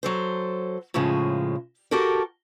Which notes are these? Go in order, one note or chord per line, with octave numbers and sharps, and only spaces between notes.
F#3 A4 C5
A2 C#3 F3 G#3
F#4 G4 A4 A#4